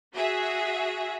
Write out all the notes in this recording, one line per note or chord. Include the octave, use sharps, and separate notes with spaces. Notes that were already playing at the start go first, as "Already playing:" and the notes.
F#4 G#4 E5